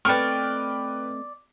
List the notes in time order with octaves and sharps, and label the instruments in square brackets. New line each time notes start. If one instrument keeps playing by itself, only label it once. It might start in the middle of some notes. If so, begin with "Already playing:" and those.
[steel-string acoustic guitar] A3 C4 D#5 [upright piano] B4 G5 F6 [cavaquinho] D5 C#6